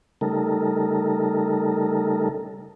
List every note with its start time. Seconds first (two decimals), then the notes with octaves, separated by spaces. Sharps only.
0.21 C#3 G3 A3 D#4 A4 A#4